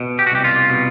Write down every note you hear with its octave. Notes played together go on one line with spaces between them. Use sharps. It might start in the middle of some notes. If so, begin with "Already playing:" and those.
Already playing: B2
G4
F#4
C2 G4
F4
B2